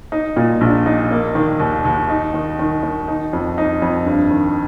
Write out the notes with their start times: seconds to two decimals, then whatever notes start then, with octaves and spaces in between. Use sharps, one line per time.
0.12 D#4
0.36 A#2
0.61 A#1
0.86 D#4
1.11 A#3
1.35 D#3
1.60 D#2
1.85 D#2
2.09 D#4
2.34 D#3
2.59 D#3
2.83 D#3
3.08 D#4
3.33 F2
3.58 D#4
3.82 F2
4.06 G2
4.31 D#3